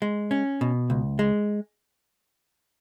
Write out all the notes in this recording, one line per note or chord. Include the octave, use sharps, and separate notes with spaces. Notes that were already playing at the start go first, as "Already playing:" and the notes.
G#3
C#4
B2
C#2
G#3